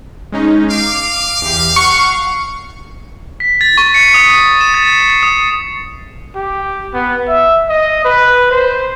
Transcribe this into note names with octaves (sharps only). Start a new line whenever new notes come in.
G#3 C#4 D#4
F5 D6
E2 G4
F#5 C#6
B6
A6
C#6
C#7
D#6
E7
A6
C7
D#6
G4
B3
E5
D#5
B4
C5